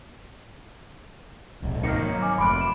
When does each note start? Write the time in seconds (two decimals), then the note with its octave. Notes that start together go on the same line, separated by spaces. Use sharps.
1.62 D1 B1
1.83 G#1 A#3 D#4 F6 A#6 C#7
2.03 F#3
2.22 G#5 D6 F6
2.38 F1 B5 C6 D6 F#6 D7
2.61 E7